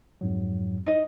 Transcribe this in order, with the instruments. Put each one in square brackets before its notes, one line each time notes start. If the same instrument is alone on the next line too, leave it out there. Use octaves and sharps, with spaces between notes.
[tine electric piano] F2 G#2 F#3
[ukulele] D#4 D#5